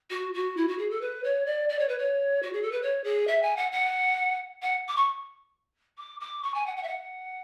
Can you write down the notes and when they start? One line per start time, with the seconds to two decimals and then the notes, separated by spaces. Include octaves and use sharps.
0.10 F#4
0.33 F#4
0.56 E4
0.68 F#4
0.78 G#4
0.90 A4
1.01 B4
1.24 C#5
1.46 D5
1.69 D5
1.79 C#5
1.88 B4
1.98 C#5
2.42 F#4
2.52 G#4
2.62 A4
2.71 B4
2.82 C#5
3.04 G#4
3.27 E5
3.42 G#5
3.56 F#5
3.72 F#5
4.62 F#5
4.88 D6
4.96 C#6
5.98 D6
6.20 D6
6.43 C#6
6.54 G#5
6.66 F#5
6.76 F#5
6.83 E5
6.88 F#5